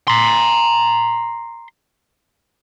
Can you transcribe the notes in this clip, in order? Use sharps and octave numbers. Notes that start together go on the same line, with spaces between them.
A#5 C6